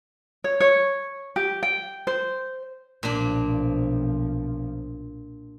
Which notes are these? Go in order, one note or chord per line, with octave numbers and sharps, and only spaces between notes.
C#5
C#5
G4
G5
C5
B1 A#2 F3 D4